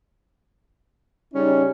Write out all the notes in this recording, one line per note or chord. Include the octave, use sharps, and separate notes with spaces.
C#3 G3 C#4 D#4